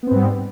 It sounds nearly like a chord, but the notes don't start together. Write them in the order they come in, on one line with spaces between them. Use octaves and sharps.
B3 C4 G#2 G3